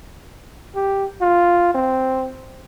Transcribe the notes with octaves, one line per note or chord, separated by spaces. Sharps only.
G4
F4
C4